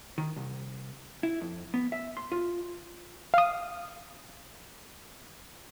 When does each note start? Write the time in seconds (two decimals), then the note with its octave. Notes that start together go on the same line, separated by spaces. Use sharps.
0.18 D#3
0.36 C2
1.23 E4
1.41 F2
1.74 B3
1.92 E5
2.17 C6
2.32 F4
3.34 F5 D#6